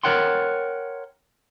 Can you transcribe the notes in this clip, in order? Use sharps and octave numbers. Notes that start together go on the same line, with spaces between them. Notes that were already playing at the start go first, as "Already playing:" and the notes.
A#4 B4 C#5 F#5 G5 C6